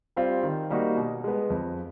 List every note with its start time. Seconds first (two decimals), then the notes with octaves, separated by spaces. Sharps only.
0.16 G3 C4 F4
0.43 D#3
0.70 G3 A#3 D#4 F#4
0.97 B2
1.24 G#3 B3
1.50 F2